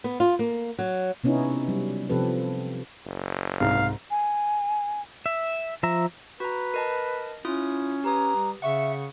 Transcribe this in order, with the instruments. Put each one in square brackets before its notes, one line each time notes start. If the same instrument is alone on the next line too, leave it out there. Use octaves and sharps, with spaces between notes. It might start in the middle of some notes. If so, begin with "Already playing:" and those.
[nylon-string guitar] B3
F4
A#3
F#3
[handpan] C3 B3 C#4 D#4 E4
F#3 G3
C3 F3 C4 G4 A4 B4
[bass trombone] F#1
[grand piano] C2 G#2 [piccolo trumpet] F5
[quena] G#5
[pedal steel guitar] E5
F3 E5 A#5
[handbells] F#4 A#5 [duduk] B4
[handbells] A#4 D#5 A5
[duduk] C#4 [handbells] E4 F4 D#6
[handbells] G4 B4 D#6 [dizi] A#5
[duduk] G3
[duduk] C#3 [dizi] E5 [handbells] F#5 C#6 C#7